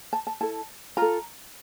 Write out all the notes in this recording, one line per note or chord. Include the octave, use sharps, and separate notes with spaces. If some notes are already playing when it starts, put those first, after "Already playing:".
A5
A5
E4 A4 A5
F4 A4 A#5